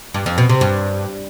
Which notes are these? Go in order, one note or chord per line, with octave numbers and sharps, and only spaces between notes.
G2
F2
B2
C3
G2